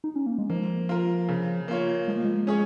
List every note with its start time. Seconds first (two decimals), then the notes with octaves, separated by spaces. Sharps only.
0.04 D#4
0.16 C#4
0.26 A#3
0.38 G#3
0.50 F3 A#3
0.89 F4 A#4
1.29 C#3
1.68 A#3 F4 C#5
2.08 F3 G#3
2.17 A#3
2.25 G#3
2.47 C#4 G#4 C#5